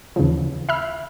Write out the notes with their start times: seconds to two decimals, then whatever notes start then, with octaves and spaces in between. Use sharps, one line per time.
0.16 D#2 C#3 E3 F3
0.69 E5 B5 F6